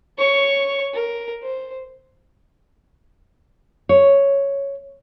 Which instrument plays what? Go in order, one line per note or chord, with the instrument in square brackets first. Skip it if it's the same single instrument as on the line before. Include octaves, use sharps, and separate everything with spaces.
[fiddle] C#5 C#6
A#4
C5
[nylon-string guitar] C#5